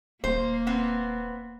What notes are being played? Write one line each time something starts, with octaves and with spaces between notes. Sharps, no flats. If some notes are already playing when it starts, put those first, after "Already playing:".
D#1 A#3 C5
B3 C4